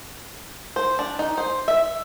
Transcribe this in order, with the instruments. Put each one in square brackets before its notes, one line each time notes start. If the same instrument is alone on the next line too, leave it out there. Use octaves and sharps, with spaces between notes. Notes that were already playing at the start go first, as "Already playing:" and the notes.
[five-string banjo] C5
D4
D#4
C5
E5